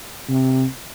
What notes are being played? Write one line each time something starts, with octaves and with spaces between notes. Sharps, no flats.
C3